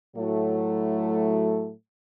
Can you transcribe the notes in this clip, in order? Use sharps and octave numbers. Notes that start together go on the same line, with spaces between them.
A2 F#3 A3